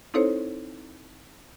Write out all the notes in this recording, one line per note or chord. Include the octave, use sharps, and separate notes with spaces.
C4 D#4 E4 A4 C5 C#5